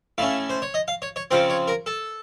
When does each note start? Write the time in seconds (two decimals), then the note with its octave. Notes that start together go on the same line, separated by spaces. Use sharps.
0.18 A2 A3 C#4 F5
0.50 C5
0.62 C#5
0.74 D#5
0.88 F5
1.02 C#5
1.16 C#5
1.31 C#3 F3 C4 C5
1.50 C#5
1.68 A#4
1.86 A4